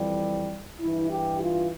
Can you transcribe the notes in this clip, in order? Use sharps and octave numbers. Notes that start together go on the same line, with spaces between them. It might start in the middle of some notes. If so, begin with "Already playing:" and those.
Already playing: F2 E3 G3
G2 E3 E4
G4
F4